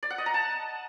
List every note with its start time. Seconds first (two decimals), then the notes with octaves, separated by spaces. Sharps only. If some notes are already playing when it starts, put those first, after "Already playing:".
0.03 D5
0.10 F#5
0.18 D#5
0.26 A#5
0.34 A5